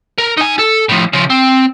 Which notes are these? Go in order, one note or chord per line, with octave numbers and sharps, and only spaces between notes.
A#4
D#4 G#5
A4
A2 F3
C#3 F3
C4